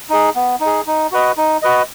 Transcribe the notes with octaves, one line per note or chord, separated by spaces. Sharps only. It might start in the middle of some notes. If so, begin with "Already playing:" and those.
D#4 G#4
B3
D#4
G#4
D#4
F#4 B4 D#5
D#4
F#4 B4 D#5